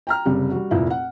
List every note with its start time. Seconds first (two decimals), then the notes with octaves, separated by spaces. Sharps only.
0.07 G5 A#5 F6
0.25 F#1 C3 G3
0.51 G3 F#4
0.71 F1 F2 A#2 E4
0.90 F#5